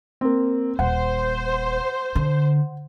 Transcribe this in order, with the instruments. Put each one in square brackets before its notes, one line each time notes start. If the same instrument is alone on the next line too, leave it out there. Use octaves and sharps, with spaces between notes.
[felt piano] A#3 C4
[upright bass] D#1 [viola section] C5 [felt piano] F#5
[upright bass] D3